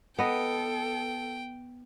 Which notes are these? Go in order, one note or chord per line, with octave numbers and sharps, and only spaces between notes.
B3 A4 D#5 G5